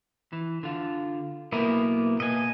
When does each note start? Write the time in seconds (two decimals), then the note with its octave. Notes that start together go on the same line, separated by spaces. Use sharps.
0.33 E3
0.63 D3 F4
1.52 B1 A#3 B3 E4 A#4
2.20 B2 A#3 B4 D#5 G#5